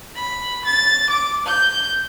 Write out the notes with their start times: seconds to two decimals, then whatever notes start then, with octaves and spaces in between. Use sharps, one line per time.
0.15 B5
0.65 A6
1.09 D6
1.46 G6